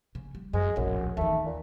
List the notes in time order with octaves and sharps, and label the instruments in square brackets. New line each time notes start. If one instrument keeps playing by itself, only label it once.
[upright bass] C#3
G3
[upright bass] F#2 [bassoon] G#3
[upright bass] D1 A#1 [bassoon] F#2
[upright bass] D#2 E3 [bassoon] A3
[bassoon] A#2